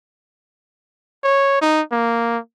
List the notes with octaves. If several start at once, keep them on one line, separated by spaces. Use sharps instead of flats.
C#5
D#4
A#3